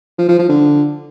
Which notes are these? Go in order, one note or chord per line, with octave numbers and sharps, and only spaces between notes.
F3
F3
F3
D3